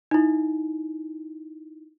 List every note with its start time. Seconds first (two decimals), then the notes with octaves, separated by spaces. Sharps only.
0.11 D#4 E4